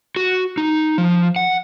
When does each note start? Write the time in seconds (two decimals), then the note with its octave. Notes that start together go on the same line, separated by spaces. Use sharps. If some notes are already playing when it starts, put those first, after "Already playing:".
0.16 F#4
0.57 D#4
0.98 F3
1.36 F#5